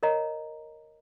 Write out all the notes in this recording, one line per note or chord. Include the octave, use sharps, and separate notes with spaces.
A#4 C#5 D#5 A#5